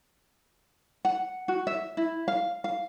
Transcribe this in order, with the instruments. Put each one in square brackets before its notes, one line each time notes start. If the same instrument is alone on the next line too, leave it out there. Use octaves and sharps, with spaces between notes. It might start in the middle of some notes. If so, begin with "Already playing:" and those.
[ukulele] F#5
F#4
E5
E4
F5
F5